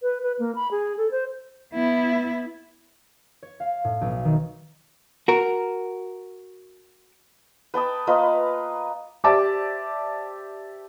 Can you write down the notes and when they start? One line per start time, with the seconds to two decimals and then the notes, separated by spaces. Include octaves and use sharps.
0.02 B4
0.22 B4
0.39 A#3
0.55 B5
0.71 G#4
0.97 A4
1.11 C5
1.74 B3 E4
3.43 C#5
3.60 F5
3.84 A2
4.01 B1
4.25 D#3
5.28 F#4 A#4
7.74 B4 G5 A5 D#6
8.07 A#3 F4 B4 D#5
9.24 G4 C5 D5 E5 A5 D6